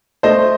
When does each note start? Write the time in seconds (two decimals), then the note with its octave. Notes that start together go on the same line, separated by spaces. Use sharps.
0.23 A3 C5 D#5